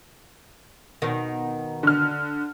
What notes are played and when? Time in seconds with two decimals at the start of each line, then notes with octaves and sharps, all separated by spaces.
1.02 B2 D#3
1.83 D3 F6